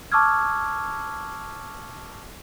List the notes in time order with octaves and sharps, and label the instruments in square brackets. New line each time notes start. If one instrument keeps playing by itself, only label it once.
[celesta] A5 C#6 D6 E6 F6 G#6